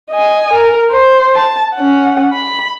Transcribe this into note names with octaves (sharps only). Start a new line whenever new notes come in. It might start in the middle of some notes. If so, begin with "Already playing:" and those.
D#5 G#5
A#4
C5
A5
C#4 F#5
B5